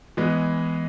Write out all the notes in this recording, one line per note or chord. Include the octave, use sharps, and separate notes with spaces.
E3 G#3 B3